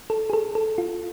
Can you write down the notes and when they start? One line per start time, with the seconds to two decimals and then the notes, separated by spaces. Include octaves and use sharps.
0.10 A4
0.30 G#4
0.33 A4
0.55 A4
0.78 F4